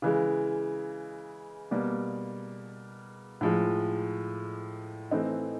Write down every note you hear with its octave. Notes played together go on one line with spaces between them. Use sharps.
C#3 E3 G#3
B2 G3 A#3
A2 F3 G#3
E3 A3 C4 D#4